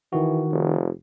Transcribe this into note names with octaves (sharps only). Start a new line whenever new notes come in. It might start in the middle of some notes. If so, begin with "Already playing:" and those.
D#3 E3 F#4
F1